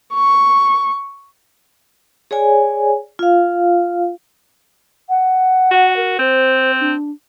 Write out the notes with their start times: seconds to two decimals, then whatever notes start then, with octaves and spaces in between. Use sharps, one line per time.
0.14 C#6
2.31 G#4 C#5 D5 G#5
3.19 F4 F5
5.09 F#5
5.71 F#4
5.96 A#4
6.19 C4 C5
6.80 D4